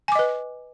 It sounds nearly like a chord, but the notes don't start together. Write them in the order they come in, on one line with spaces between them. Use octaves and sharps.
G#5 D6 D#5 B4